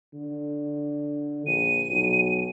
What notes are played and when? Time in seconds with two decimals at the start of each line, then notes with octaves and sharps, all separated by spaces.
0.14 D3
1.47 A#1 D#7
1.90 B1